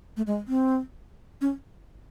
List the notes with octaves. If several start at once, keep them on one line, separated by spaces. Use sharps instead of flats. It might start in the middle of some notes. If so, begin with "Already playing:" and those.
A3
G#3
C4
C#4